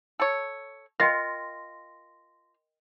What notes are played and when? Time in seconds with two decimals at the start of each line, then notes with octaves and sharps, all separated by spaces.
0.20 A4 C#5
1.00 F4 A#4 D#5 G5 C6 A#6